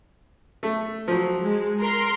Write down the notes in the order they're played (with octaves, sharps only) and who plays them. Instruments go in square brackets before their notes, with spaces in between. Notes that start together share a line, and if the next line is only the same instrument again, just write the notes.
[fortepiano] A3
F3 F#3
[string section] G#3
A#4 C6